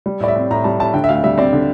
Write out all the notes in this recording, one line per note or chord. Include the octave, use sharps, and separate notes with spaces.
G3
A2 D5
E5
C4
A2 A#5
G3 A5
A2 A5
D3 G5
E5
D2 F5
G3 E5
C4 D5
D3